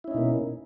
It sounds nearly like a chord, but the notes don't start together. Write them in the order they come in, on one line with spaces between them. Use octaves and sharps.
E4 C#4 D#4 B2 A#3